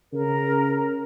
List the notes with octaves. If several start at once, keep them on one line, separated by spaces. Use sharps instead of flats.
C#3 A#4